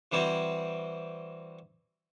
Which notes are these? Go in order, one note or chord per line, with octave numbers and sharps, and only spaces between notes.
E3 G3 C4 E4 F#4